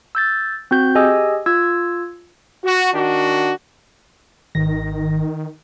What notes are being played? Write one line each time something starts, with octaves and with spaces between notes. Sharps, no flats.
E6 G6 A6
C4 F#4 G6
G4 G#4 D#5 G#5 E6
F4 E6 G#6
F#4
D#3 D4 F#4
G#1 D#3 A#6